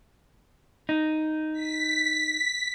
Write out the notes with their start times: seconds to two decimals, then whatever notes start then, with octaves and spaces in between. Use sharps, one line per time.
0.89 D#4
1.53 B6